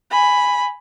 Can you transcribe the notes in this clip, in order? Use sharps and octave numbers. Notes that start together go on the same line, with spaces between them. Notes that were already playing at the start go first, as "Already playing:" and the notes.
G#5 B5